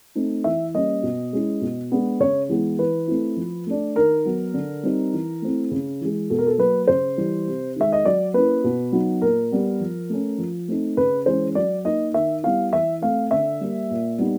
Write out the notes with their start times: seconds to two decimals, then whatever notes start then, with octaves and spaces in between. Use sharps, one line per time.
0.15 A3 C4 D#4
0.44 E3 E5
0.74 G3 A#3 C#4 D#5
1.03 B2
1.33 G#3 C#4 E4
1.61 B2
1.91 G#3 B3 D4
2.20 C#3 C#5
2.49 E3 G#3 B3 E4
2.79 E3 B4
3.08 A3 C4 E4
3.37 F3
3.67 A3 D4
3.96 D#3 A#4
4.25 F#3 B3
4.54 D3
4.83 G3 C4 D#4
5.13 E3
5.42 A3 C4 E4
5.71 C#3
6.01 E3 G#3
6.30 B2 A4
6.39 A#4
6.47 A4
6.58 F#3 A#3 B4
6.87 C#3 C5
7.17 E3 G3
7.47 C3
7.76 D#3 G#3 E5
7.92 D#5
8.05 F#3 D5
8.34 A#3 C#4 E4 B4
8.64 B2
8.92 F#3 B3 D#4
9.21 A#2 A#4
9.52 G3 B3
9.80 F3
10.10 A3 C#4
10.38 F3
10.68 A3 C4 D#4
10.97 C#3 B4
11.26 E3 G#3 C#4 C5
11.55 F#3 D5
11.85 A#3 D#4 D#5
12.14 D#3 E5
12.43 G3 B3 E4 F5
12.72 E3 E5
13.01 A3 C4 F5
13.31 D3 E5
13.61 G3 A#3
13.90 A#2
14.18 G3 B3 D#4